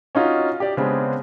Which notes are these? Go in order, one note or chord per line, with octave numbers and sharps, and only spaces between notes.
C#4 D#4 F4 F#4
G4 D5
C#3 G#3 B3 C4 D4